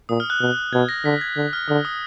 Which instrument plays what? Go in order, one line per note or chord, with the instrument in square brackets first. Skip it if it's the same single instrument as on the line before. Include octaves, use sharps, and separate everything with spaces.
[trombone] A#2 [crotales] D#6
[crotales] F6
F#6
[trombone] B2
[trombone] B2 [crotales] G#6
[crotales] A#6
[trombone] D3 [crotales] B6
[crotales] G#6
[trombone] D3
[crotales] F6
[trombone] D3 [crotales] D#6
[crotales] D#6